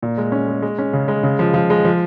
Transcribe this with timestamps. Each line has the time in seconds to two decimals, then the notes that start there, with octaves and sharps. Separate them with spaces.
0.03 A#2
0.18 G#3
0.32 C#4
0.48 G#3
0.62 G#3
0.78 C#4
0.93 C#3
1.08 G#3
1.23 C#3
1.39 F3
1.54 F3
1.70 G#3
1.85 F3